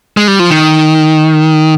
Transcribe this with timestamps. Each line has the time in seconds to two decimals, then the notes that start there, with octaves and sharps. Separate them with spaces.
0.17 G#3
0.28 G3
0.39 F3
0.50 D#3